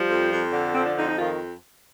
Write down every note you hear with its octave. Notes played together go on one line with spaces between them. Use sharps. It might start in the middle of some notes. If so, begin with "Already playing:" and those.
Already playing: F3 G3
F2
F2
D3
F3 C4
D4
F2 D#4
D#4
D#3 F4